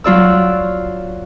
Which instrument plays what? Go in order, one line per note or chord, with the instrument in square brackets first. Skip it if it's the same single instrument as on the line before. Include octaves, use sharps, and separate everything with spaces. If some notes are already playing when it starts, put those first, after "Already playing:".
[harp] F#3 F4 D5 E6